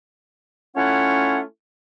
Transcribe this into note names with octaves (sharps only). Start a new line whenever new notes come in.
A3 C#4 E4 F4 C#5 F#5